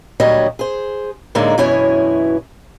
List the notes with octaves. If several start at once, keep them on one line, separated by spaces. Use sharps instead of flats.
D2 A#2 F#3 G3 C#5 D#5
G#4 C5
A2 D3 G#3 A#3 D#4
F#2 B2 E3 E4 C#5 G#5